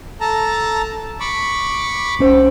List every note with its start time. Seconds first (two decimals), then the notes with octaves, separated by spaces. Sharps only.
0.21 A4 A5 A#5
1.20 B5 C#6 D6
2.19 C2 C#4 C5